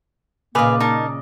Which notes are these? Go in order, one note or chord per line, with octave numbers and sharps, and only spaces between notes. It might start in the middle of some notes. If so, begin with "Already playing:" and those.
A#2 C#3 A#3 B4 D5 D#5 F5 G#5
D#4 A#4 A5